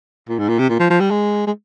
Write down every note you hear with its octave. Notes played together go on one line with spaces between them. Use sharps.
A#2
G#2
A#2
C3
A#2
F3
F3
G3
G#3
G#3